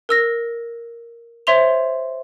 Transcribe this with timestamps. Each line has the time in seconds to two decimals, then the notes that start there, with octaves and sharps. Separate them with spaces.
0.09 A#4 E6 A#6
1.47 C5 C#5 E5 C6 F7